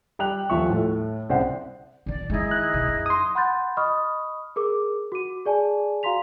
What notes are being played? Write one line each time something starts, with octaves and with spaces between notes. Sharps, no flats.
G3 G5 F#6 F7
D#1 F3 E5 C#6
A2 A3
C2 C#3 C5 D5 F#5
A#2 D#3 D5
D#3 G#3 D#4 E4 G#4
F#6
B2
F#2
C6 D#6
F#5 B5 C6 F#6 G6 A6
D#5 B5 C#6 D#6 F6
G#4 A#4 D6
F#4 D6 D#7
G#4 D5 G#5 A5
F#4 F5 A#5 C6 B6 F7